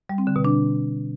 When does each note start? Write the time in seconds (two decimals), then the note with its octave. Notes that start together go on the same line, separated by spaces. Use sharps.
0.09 G3
0.18 C4
0.27 D3
0.36 B2
0.45 D4